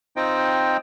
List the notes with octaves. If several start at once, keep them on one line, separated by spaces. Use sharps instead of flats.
C4 D#4 F4 C5 D#5 G5